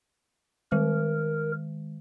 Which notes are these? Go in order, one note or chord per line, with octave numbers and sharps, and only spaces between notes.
D#3 G#3 A#4